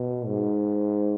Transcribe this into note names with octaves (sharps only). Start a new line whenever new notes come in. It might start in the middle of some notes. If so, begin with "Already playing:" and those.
Already playing: B2
G#2